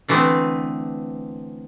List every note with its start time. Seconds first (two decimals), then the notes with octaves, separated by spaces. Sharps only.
0.08 D3 E3 A3 B3 C4